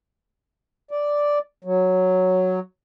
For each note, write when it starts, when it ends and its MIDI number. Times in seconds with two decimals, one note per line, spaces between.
0.91 1.39 74
1.65 2.59 54